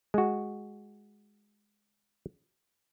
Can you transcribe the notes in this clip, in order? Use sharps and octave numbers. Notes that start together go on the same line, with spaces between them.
G#3 F#4